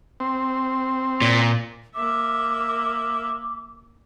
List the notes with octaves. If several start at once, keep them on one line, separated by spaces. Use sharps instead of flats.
C4
A#2
A#3 E5 D6